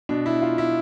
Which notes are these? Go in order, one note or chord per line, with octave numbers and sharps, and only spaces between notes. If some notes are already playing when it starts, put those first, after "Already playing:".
B2 D4
E4
F4
E4